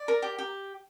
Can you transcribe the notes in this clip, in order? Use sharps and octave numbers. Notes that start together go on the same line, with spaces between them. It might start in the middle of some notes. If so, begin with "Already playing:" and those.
Already playing: D5
A#4
G4
G4